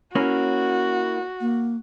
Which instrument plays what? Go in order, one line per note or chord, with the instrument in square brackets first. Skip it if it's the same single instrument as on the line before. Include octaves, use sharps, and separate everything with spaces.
[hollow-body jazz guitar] A#3 C#4 E4 [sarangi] F#4
[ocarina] A#3